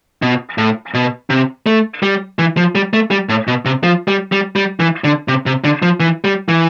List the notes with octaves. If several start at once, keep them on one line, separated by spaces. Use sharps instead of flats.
B2
A2
B2
C3
A3
G3
E3
F3
G3
A3
G3
A2
B2
C3
F3
G3
G3
G3
E3
D3
C3
C3
D3
F3
E3
G3
E3